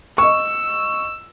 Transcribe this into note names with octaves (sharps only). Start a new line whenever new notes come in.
D#5 C#6 E6